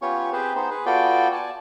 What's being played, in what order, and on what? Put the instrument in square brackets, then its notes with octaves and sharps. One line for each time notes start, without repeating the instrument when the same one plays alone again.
[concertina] B3 C#4 F4 G4 C#5 C#6
C4 G4 G#4 B4 C5
B3 D#4 C5
G#4 B4
B3 F4 F#4 A4 D5 G5
D5 G#5 A5